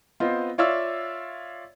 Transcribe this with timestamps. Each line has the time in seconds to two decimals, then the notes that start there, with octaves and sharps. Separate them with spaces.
0.20 B3 C4 F4 C5 D#5
0.58 F4 C#5 D5 E5 F5 E6